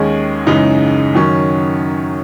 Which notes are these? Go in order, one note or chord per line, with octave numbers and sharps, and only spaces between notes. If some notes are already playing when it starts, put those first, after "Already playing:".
Already playing: D#2 D#3 G#3 C#4 G#4
F#2 C#3 E3 G#3 D#4
F#2 D#3 F#3 C#4